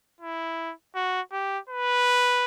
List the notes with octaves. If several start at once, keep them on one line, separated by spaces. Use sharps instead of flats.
E4
F#4
G4
B4